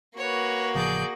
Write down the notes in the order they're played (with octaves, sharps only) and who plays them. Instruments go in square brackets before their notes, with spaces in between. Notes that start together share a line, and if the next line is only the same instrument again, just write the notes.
[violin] A#3 F#4 [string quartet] B4 C#5
[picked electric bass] A1 C#3 F3 [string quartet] G#4 D5 G6